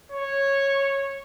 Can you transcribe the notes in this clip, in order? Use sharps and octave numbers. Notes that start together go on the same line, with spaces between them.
C#5